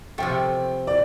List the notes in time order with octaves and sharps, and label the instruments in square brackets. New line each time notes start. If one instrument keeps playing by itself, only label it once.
[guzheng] C3 F3 A3 [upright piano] G5
[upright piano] D5